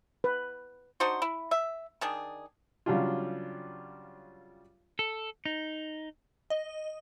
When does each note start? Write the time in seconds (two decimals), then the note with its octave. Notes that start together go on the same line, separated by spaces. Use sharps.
0.24 B4
1.00 D4 D#4 F#4 C5
1.22 E4
1.51 E5
2.01 D#3 D4 G#4
2.86 C#3 F#3 G3 D4 F4
4.99 A4
5.45 D#4
6.50 D#5